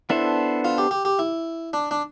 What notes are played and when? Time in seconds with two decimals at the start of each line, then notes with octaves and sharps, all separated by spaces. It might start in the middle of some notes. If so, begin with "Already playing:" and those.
0.10 B3 D4 E4 A4 C5
0.65 F4
0.78 G4
0.91 G4
1.05 G4
1.19 E4
1.73 D4
1.91 D4